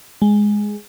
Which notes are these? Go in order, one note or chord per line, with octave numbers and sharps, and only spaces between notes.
G#3